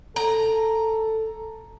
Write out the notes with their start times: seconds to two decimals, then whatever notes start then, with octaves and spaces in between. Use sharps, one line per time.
0.16 A4 A#5